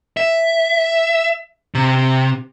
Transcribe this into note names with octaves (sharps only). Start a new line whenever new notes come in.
E5
C3